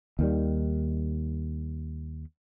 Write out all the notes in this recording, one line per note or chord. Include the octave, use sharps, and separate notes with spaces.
D#2 D#3 G3